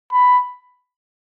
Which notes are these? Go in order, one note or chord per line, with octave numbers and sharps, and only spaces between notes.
B5